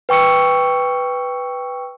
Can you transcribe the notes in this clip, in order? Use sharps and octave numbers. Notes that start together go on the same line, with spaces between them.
B4 G5 C#6 E6 C#7